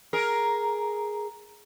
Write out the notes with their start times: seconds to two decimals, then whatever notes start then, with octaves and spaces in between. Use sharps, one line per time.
0.13 G#4 A#4